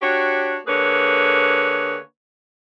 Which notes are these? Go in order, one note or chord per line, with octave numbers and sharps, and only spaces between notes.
D4 F#4 G4 C#5
D3 A#3 G#4 B4 C#5